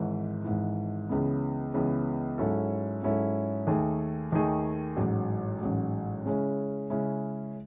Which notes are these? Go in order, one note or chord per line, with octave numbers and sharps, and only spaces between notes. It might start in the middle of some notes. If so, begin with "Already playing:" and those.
Already playing: G#1 G#2 E3
G#1 G#2 E3
C#2 C#3 E3 B3
C#2 C#3 E3 B3
G#2 F#3 C#4 E4 A4
G#2 F#3 C#4 E4 A4
D#2 D#3 A3 D#4 G#4
D#2 D#3 A3 D#4 G#4
A1 G#2 F#3
A1 G#2 F#3
C#3 G#3 C#4 E4
C#3 G#3 C#4 E4